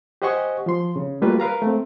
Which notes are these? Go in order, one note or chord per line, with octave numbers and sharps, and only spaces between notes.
G4 C5 D#5 F#5 G#5 C#6
F3 C6
C#3
G3 A3 A#3 F4 F#4 B4
A#4 B4 F5 A#5
A3 C4